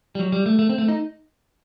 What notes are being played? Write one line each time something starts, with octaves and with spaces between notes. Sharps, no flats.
G3
F#3
G3
A3
A3
C4
A3
D#4